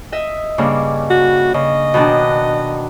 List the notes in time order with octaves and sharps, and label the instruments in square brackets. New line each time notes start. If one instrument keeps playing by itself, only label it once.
[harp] D#5 E5
G2 C#3 A#3
[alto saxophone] F#4
[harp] C#3 [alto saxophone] D#5
[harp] B2 D#3 D4